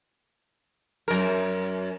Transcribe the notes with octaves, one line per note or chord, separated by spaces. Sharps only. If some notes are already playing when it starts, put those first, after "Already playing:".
F#2 A#4